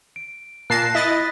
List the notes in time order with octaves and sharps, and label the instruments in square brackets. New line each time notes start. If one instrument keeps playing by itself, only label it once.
[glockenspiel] D7
[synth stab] A#2 A5 C7 [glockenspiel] F#6 A#6
[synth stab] E4 D#5 A6 [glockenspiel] B6